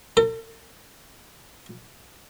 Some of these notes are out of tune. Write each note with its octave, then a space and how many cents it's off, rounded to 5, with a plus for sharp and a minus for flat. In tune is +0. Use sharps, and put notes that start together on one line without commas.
A4 +45